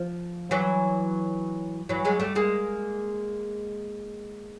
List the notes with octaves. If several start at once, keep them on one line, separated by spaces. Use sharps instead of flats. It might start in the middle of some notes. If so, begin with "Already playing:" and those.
Already playing: F3
E3 F#3
E3 F#3
F#3 G#3
G3 A3
G#3 A#3